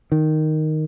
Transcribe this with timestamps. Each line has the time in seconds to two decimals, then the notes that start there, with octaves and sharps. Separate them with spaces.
0.12 D#3